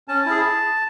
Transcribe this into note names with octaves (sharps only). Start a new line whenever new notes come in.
C#4 A5
E4 G#4